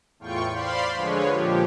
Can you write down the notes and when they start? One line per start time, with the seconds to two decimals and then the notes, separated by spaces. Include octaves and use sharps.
0.19 E2 A2 F4 G5 C#6
0.52 C5 D5 F5 B5 C6
0.94 D3 F3 G#3 B4 C#5
1.30 A#2 F3 G4